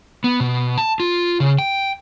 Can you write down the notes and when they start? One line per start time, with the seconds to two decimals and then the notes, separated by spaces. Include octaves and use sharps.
0.24 B3
0.40 B2
0.77 A5
1.00 F4
1.40 C#3
1.59 G5